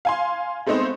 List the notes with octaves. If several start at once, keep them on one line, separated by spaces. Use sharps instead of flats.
F5 G#5 C6
G#3 A3 B3 C4 D#4 C5